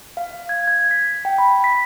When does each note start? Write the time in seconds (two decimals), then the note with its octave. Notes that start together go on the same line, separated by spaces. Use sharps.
0.17 F5
0.49 G#6
0.67 G#6
0.91 B6
1.25 G5
1.38 B5
1.64 B6